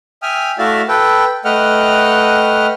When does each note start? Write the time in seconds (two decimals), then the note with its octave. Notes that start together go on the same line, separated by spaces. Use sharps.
0.22 E5 G5 G#5 D#6 F6
0.58 A3 E4 F#4 D5 E5 F5
0.89 A4 B4 G5
1.45 A3 B4 D#5 F#5 G5 F6